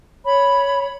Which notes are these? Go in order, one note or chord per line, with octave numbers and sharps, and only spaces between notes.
C#5 B5